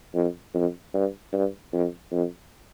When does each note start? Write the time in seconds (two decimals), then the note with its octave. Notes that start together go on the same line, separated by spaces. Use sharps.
0.14 F2
0.54 F2
0.94 G2
1.33 G2
1.73 F2
2.12 F2